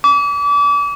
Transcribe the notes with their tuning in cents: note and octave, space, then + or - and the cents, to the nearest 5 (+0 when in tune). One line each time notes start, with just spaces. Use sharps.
D6 -35